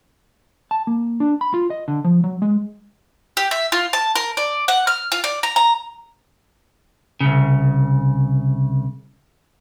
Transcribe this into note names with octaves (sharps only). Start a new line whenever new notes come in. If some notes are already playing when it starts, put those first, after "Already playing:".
A5
A#3
D4
B5
F4
D#5
D3
F3
F#3
G#3
G4
E5
F4
A5
A#4
D5
F#5
F6
F4
D5
A#5
A#5
C2 C#3